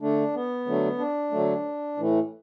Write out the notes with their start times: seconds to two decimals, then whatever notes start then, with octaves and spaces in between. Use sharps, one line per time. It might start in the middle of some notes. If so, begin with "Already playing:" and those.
0.01 D3 A3 D4
0.34 B3
0.66 D3 F#3 A3
0.98 D4
1.31 D3 F#3 A3
1.97 A2 E3 A3